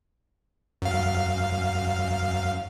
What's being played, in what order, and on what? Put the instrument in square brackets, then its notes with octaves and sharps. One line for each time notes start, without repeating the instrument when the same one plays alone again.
[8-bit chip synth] F#2 F5